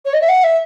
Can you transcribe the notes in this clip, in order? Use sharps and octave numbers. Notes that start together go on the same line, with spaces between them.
C#5
D#5
E5
F#5
E5